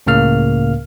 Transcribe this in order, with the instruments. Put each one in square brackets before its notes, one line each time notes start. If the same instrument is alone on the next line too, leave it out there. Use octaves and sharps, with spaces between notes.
[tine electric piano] C#2 A2 C#3 A#3 F5 F6